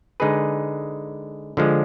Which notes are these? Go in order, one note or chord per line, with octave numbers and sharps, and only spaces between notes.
D3 G#3 D#4 G#4 B4
D3 F3 G#3